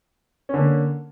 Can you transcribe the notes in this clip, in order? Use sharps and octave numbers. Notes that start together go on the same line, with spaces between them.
D3 A#3 C#4